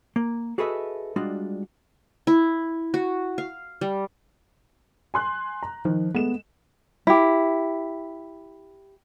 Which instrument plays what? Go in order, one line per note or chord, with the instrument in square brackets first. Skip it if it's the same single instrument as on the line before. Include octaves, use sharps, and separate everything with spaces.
[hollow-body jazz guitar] A#3
F#4 G#4 A4 B4 D#5 E5
G3 G#3 D4 F4 F#4
[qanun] E4
F#4
F5
G3
[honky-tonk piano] G#5 C6 F#6
A#5
[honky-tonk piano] D#3 [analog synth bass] F3
[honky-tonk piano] G#3 A3 E7 [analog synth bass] B3
[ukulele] E4 G4